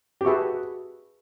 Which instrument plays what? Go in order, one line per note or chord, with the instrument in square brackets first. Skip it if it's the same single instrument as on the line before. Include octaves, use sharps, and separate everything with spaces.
[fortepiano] G4
[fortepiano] F#4 [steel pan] G#4 B4 E5 A5 C#6